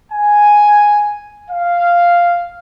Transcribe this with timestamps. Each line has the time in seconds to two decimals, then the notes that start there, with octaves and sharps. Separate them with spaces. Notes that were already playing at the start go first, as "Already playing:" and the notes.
0.12 G#5
1.50 F5